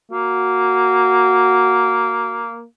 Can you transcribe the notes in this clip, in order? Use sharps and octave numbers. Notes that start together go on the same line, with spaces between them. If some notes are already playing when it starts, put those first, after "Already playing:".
A#3 F#4